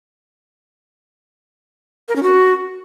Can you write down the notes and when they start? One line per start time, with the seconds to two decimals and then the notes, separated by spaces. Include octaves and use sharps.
2.09 A#4
2.16 C#4
2.23 F#4